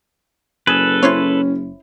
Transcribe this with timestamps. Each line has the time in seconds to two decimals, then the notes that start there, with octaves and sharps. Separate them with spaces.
0.67 F#1 G#4 A4 B4
1.03 C#4 E4 C5 C#5